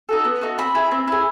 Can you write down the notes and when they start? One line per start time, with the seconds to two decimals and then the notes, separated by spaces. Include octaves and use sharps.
0.09 D#4 F#4 A4
0.24 B3
0.41 D#4 F#4 A4
0.58 C4 B5
0.75 E4 G#4
0.91 C4
1.08 E4 G#4